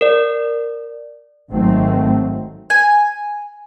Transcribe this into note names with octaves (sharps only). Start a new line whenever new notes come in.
A#4 D5
G#1 G#2 D#3 F#3 A3 C4
G#5